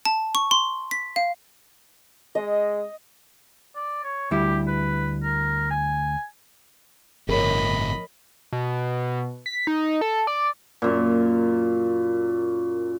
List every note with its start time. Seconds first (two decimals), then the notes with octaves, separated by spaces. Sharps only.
0.05 A5
0.35 C#6
0.51 C6
0.91 B6
1.16 F5
2.35 G#3 D#5
3.76 D5
4.04 C#5
4.31 D2 G3 E4 G4
4.67 B4
5.23 A#4
5.71 G#5
7.29 G1 F2 A2 A#4 C#5 D#5 B5
8.53 B2
9.46 B6
9.67 D#4
10.01 A4
10.27 D5
10.82 F#2 A#2